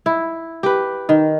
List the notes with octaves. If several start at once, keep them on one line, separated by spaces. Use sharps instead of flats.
E4
G4 B4
D#3